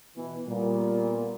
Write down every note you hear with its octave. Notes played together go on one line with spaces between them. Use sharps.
B2 E3
A#2 G3 A#3 B3